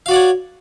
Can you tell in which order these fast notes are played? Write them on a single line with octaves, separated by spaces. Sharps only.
F5 F#4 D5 F#5 C#5